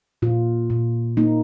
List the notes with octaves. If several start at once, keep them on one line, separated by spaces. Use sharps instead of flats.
A#2 F4
A#2
A#3 D#4